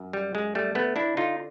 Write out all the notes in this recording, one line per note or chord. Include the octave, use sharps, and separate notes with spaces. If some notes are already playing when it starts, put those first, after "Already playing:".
Already playing: F#2
G3
F#2 G#3
G3 A3
D3 A3 B3
D4 E4
D3 D#4 F4